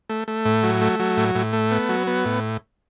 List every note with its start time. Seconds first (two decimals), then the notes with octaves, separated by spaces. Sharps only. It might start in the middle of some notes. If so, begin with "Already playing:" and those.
0.09 A3
0.28 A3
0.45 A2
0.63 F#3
0.82 A3
1.00 F#3
1.17 A2
1.35 A2
1.53 A3
1.71 B3
1.89 F#3
2.07 B3
2.25 A2